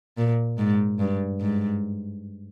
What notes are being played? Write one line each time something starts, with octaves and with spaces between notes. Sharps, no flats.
A#2
G#2
G2
G#2